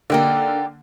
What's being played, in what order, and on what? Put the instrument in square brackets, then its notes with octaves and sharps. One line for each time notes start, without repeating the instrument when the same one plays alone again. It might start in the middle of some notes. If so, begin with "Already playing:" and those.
[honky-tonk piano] D3 A#3 [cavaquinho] D#4 G4 D5